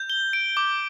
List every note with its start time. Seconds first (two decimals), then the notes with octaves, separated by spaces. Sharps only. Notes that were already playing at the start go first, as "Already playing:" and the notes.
Already playing: G6
0.10 G7
0.33 D7
0.57 D6